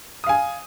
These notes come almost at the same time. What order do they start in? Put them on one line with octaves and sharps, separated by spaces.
D#6 F5 G#5